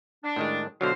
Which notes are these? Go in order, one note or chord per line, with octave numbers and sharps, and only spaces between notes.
D4
A2 D#3 G#3
B2 D3 F#3 F#4 C5 F5